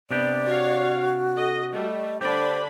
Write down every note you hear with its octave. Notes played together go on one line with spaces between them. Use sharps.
C3 B3 D4 G4 D5
F#4 C#5 F5
A4 D#5
G3 A3 D#5
D3 D4 G4 C5 D5 B5